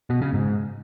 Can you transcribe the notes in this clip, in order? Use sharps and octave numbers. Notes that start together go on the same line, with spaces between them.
B2
C#3
G#2